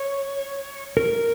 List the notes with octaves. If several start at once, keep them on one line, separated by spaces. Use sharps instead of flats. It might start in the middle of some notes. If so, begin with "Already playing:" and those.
Already playing: C#5
A#4